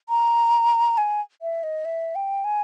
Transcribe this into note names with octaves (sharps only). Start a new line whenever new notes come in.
A#5
G#5
E5
D#5
E5
G5
G#5